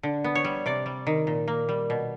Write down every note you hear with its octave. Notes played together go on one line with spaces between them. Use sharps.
D3
B3
C#5
G3
C3 D5
G3
D#3
A#2
A#3
G3
B2